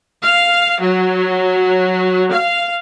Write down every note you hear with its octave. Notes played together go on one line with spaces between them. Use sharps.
F5
F#3
F5